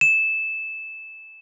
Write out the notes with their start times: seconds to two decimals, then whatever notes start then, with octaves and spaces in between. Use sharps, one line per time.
0.01 E7